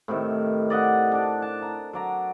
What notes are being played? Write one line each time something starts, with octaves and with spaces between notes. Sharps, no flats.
A2 C3 D#3
D5 D#5 F#5
D4 D5
A5
A#5
F#3 D5 A#5